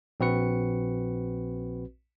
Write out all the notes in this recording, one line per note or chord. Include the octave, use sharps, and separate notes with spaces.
A#1 C4 F#4 B4 C#7